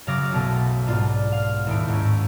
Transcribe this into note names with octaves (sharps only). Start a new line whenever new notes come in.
F#2 C#3 F5 D6 A#6 D7
B1 B2 A3 D#6
G#2 B3 D4 F4
F5
D#2 A2 E4 D7
G#2 C#4